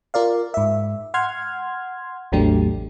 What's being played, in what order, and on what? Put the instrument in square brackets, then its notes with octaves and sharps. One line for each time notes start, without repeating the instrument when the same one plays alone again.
[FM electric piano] F4 A#4 D5 F5
G#2 E5
F#5 C6 F6 G#6
A1 E2 F#3 A3 D4 G4